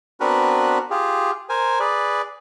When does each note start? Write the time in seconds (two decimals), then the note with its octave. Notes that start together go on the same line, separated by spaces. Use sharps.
0.20 B3 C4 D4 F#4 A#4 B4
0.90 F4 G4 G#4
1.49 A#4 C5 G#5
1.80 G#4 B4 D5